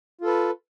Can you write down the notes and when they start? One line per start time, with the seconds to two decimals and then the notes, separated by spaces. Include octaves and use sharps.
0.21 F4
0.24 A4
0.27 B4